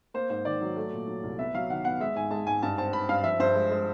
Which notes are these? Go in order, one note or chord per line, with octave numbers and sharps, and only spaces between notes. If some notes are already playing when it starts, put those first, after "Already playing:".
A#3 C5
G#2 C5
D#3 D5
F#3
A3
A#2
F#3
C2
B3 E5
F#3 F5
D#3 F#5
B3 F#5
G#3 E5
G#2 G#5
G#3 A5
G#2 G#5
G2 A5
C4 A5
C4 B5
G2 F5
F3 E5
G2 C5
G#3
G#3